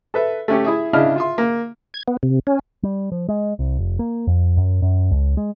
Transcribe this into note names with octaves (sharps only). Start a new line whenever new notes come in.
A4 B4 E5
A3 C#4 G4
E4 G#4 E5
C#3 D4 E4 D#5 F6
F4 E5 C6
A#3
G#6
B3
C3
C#4
G3
F3
G#3
C2
F1
A#3
F2
F#2
F#2
C#2
G#3